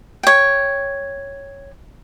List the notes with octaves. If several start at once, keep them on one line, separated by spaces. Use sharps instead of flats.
C#5 G5